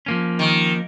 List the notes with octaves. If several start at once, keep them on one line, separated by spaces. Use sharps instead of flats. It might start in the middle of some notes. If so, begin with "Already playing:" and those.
F3 A#3 C#4
D#3